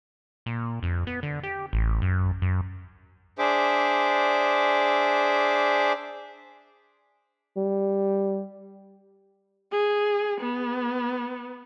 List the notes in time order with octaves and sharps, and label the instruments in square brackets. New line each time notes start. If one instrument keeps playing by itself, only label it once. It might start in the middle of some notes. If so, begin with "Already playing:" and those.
[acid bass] A#2
F2
B3
D3
G4
A1
F#2
F#2
[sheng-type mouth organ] D4 G#4 C5 E5 D6
[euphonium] G3
[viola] G#4
B3